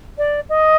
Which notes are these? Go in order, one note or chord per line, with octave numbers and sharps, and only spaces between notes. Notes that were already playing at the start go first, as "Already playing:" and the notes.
D5
D#5